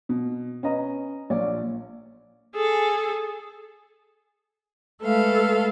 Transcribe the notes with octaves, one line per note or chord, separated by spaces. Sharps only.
B2
C#4 B4 D#5 A#5
A#1 A#2 C#5 D5
G#4 A4
G#3 A3 A4 B4 F5